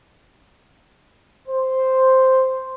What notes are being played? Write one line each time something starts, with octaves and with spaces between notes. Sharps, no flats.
C5